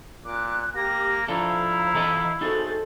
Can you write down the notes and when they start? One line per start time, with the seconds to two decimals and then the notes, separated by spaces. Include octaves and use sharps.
0.25 A#2 D6 F#6
0.76 A#3 G4 A#6
1.28 F3 D4 E4 A4 C5 F5 A#5
1.94 E3 A4 D#5
2.41 D#4 F#4 G#4 A4 C5 A6